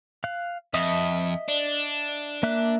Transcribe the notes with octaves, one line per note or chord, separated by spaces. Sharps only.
F5 F#6
F2 D#5 E5 D#6
D4
A#3 E5 F#6